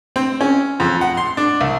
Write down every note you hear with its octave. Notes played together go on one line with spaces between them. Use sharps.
C4
C#4
F2
F#5
C6
D4
C2